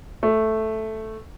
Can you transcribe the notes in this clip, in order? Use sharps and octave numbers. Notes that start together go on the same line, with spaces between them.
A3